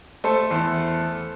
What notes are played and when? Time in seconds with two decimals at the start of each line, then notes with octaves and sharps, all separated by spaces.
0.24 A3 A4 C5
0.51 E2